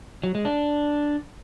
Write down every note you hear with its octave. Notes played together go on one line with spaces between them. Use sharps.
F#3
G#3
D4